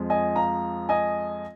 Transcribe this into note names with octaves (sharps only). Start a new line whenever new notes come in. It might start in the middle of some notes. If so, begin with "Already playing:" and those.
Already playing: F2 F3 G#3
D#5 G#5
F5 A#5
D#5 G#5